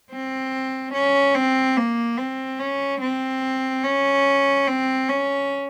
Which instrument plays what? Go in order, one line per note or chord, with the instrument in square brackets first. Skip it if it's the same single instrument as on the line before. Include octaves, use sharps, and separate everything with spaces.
[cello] C4
C#4
C4
A#3
C4
C#4
C4
C#4
C4
C#4